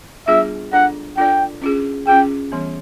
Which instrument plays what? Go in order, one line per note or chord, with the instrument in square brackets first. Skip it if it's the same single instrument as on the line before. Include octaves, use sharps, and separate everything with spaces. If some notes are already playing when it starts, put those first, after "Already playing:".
[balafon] G3 B3 D4 F4 G#4 [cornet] E5
[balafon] D4 F4 A4 D5 [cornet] F#5
[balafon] D4 F4 A4 D5 [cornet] G5
[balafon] C#4 F4 G#4
[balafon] C#4 F4 G#4 [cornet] G5
[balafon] E3 G3 B3